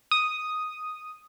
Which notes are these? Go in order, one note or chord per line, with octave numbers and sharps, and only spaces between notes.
D#6